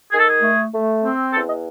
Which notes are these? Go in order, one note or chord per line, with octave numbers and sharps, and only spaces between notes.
D#3 G#4
A4
G#4
A3
A3
C4
E2 A4
D#5